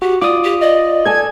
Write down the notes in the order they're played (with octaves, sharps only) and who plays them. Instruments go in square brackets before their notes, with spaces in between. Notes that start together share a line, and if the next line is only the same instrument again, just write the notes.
[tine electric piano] F#4 [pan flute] G4
[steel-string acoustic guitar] F4 [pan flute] D5 [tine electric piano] D6 D#6
[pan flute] G4
[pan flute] D5 [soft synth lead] D#5
[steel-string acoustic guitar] A4 G#5 A5 [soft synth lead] G#6